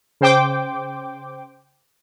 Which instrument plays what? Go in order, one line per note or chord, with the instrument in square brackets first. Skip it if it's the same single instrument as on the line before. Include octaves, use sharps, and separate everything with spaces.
[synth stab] C#3 C5 G5 D6